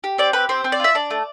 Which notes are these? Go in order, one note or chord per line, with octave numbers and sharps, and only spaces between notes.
G4
C4 D5
G4 B4
C4 C5
C4
D5
F4 E5
D4 D5
A3